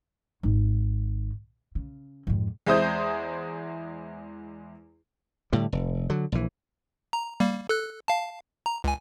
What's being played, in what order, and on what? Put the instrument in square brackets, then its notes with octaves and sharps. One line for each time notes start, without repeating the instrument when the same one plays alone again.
[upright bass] G#1 D#4
C#3
F2 G#2
[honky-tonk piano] E2 G#3 E4 C5 D#6 G6
[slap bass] A2 D3 G3
F1
D3 F#3
A#1 E3
[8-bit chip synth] A#5
G3 A#3
A4 F#6
F5 A5
A#5
C#2 G#5